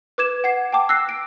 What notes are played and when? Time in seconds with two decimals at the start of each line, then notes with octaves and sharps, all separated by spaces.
0.18 B4 D6 G#6 E7
0.44 F#5 G#6 C7
0.73 G5 A5 D6
0.89 E6 F#6 A#6 C7
1.09 D7